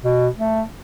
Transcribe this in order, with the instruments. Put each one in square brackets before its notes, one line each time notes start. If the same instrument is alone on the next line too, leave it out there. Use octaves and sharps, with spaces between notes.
[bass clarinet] B2
A3